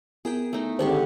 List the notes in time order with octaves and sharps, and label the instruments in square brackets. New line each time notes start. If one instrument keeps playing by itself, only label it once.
[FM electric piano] B3 E4 A#4 [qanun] G#4 G5
[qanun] A3 D#4
[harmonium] D3 G4 [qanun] D#3 D4 C#6 [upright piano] G#3 C4 [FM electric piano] A4